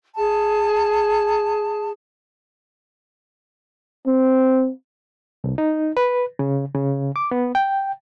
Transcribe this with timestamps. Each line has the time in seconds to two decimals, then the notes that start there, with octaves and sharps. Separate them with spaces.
0.17 G#4 A5
4.07 C4
5.44 C2
5.58 D#4
5.97 B4
6.39 C#3
6.75 C#3
7.16 D6
7.31 B3
7.55 G5